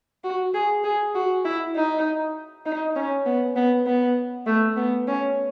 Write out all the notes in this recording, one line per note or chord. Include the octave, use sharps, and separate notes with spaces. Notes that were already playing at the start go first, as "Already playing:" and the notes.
F#4
G#4
G#4
F#4
E4
D#4
D#4
C#4
B3
B3
B3
A3
B3
C#4